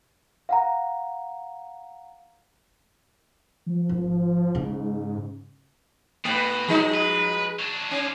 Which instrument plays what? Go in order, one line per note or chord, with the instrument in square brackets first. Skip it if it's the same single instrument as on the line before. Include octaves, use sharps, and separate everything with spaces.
[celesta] F5 F#5 A#5
[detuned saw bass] F3
[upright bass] G#1
[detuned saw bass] G#2 [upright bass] C#3
[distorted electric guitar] B2 [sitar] A3 B4
[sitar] F3 G#3 D#4
[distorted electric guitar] B4
F#3 D4
[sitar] C#4 [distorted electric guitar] F4 G#4